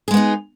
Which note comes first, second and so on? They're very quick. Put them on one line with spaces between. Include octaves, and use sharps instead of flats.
G#4 G#3 B3 D#4